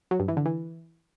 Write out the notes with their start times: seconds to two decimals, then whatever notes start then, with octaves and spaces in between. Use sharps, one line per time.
0.11 F#3
0.20 G2
0.28 E3
0.37 D3
0.45 E3